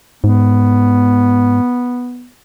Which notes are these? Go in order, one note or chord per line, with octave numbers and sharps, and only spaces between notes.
G#2 B3